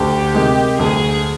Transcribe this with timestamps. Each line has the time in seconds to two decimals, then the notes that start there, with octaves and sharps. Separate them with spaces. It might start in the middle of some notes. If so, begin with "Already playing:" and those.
Already playing: D2 G4
0.34 C3 D#3 G#3
0.78 D2 G#4